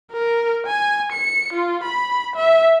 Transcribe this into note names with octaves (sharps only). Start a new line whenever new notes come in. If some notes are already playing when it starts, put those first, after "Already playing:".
A#4
G#5
C#7
F4
B5
E5